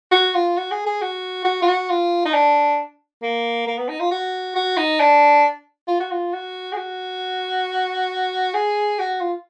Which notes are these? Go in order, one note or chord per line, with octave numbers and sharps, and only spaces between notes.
F#4
F4
F#4
G#4
G#4
F#4
F#4
F4
F#4
F4
D#4
D4
A#3
A#3
B3
D#4
F4
F#4
F#4
D#4
D4
F4
F#4
F4
F#4
G#4
F#4
G#4
F#4
F4